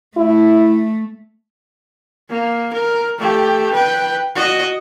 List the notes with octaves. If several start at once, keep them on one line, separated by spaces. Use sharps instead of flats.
A3 E4
A#3
A#4
A3 G4
B4 G5
F#4 D#5